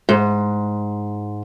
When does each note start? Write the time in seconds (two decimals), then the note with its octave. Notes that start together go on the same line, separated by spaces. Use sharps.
0.09 G#2